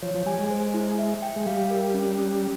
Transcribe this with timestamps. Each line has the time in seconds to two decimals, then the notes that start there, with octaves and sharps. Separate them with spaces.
0.02 F3 C#5
0.15 F3
0.26 G3 G#5
0.39 G#3
0.50 C5
0.74 E4
0.99 E5
1.22 G5
1.36 G#3
1.46 G3 F5
1.71 A#4
1.94 C#4
2.18 C#4